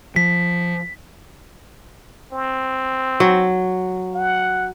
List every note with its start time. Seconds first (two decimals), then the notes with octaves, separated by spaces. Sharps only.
0.16 F3 B6
2.33 C4
3.20 F#3
4.15 F#5